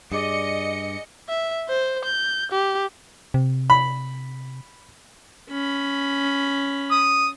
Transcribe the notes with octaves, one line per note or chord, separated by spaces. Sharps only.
G2 G#4 D5 D#5 C#7
E5
C5
G6
G4
C3
B5
C#4 B5
D#6